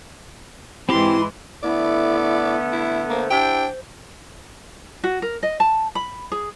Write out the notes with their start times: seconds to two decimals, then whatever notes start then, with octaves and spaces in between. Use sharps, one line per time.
0.89 G#2 E3 C4 E4 G4 C6
1.63 D3 A3 B3 E4 D5
2.72 E4
3.10 A#3 C5
3.30 D4 E4 G4 G5
5.04 F#4
5.22 A#4
5.43 D#5
5.60 A5
5.95 B5
6.32 G#4